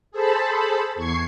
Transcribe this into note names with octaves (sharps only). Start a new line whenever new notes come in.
G#4 A4 C5 A5 B5
E2 C#6 G#6 C7